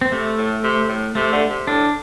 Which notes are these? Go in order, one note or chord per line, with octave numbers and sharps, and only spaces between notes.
C4
C3 A3
A2
C3
A2
C3 A3
D3
C3
A2 D4